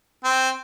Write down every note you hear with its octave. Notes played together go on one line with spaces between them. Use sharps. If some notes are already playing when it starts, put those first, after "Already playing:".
C4